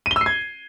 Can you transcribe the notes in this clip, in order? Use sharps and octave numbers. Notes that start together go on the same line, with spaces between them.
D#7
G7
E6
C7
G#6